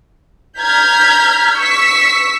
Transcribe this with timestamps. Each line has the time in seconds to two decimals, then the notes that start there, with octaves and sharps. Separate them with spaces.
0.59 A#5 F6 G6 G#6 B6
1.58 C#6 E6 B6